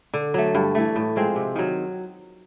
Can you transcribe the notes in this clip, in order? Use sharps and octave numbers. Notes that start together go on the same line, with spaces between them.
D3
F#3 A3
G2
E3 A3
A2
F3 G#3 C4
C3
D#3 F#3